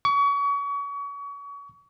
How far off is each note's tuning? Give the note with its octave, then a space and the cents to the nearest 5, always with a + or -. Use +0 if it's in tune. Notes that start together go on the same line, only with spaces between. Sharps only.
C#6 +35